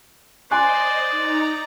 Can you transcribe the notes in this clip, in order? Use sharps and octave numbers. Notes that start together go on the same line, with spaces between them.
C5 D5 D#5 G#5 C6 F#6
D#4 A#5